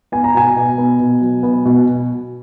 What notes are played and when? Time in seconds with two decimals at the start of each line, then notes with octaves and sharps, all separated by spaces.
0.12 B3 G#5
0.24 A#5
0.34 B2 G#5
0.56 B2
0.78 B3
1.00 B2
1.21 F#3
1.43 B3
1.65 B2